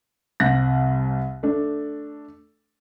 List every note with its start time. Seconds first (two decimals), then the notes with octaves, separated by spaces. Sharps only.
0.40 C2 C3 F#6 A#6
1.43 A3 D4